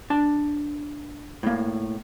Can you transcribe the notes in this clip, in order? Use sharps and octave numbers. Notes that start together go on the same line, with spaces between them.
D4 A5
A2 A#3